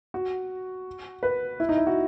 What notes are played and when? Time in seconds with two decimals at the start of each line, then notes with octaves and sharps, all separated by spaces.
0.14 F#4
1.23 B4
1.60 E4
1.69 D#4
1.77 E4
1.87 F#4